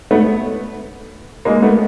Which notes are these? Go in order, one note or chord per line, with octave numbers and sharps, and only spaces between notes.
A3 B3
G#3 A#3
A3 B3